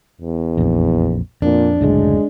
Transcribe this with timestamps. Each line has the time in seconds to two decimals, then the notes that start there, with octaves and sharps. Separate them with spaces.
0.21 E2
0.57 A#1 F2
1.42 F2 A#2 D4
1.81 F#1 D2 A2 G#3